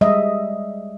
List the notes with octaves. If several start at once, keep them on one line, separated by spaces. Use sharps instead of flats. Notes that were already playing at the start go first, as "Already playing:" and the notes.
G3 G#3 D#5 E5